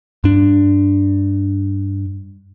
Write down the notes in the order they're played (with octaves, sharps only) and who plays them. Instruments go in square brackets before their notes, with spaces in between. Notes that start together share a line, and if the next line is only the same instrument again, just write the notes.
[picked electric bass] G2 D4